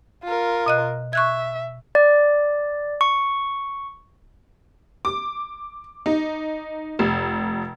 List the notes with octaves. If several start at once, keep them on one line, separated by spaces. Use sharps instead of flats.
F4 A#4
B2 D#5 F#6
E5 C#6 F#6 G#6
D5
C#6
D6
D#4
F1